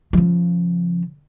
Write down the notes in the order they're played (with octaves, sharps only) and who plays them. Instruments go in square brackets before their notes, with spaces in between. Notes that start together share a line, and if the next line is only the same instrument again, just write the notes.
[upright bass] C#3 F3